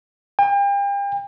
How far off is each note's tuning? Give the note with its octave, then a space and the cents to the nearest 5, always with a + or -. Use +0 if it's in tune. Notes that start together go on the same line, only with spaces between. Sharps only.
G5 +40